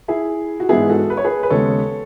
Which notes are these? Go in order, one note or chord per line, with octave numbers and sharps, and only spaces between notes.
E4 G#4
F#4
G#2 E3 B3 E4 G#4
F#4 A4
B4
C#5
G#4 B4
B4
D#2 C#3 G#3 B3 A4 C#5